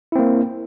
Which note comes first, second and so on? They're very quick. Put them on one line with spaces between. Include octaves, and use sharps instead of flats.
E4 C4 A#3